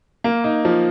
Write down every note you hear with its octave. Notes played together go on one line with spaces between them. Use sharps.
A#3
D#4
F3